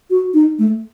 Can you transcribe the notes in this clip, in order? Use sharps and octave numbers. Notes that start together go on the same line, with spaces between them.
F#4
D#4
A3